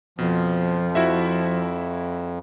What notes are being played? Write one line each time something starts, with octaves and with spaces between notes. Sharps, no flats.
F2 B2 F3
E4 F#4 E5